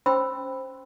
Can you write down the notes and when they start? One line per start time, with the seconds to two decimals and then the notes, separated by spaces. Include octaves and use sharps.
0.06 C#4 C5 G5 B5 C6 E6